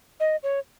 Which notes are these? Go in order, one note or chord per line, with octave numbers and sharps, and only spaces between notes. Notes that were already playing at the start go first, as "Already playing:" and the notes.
D#5
C#5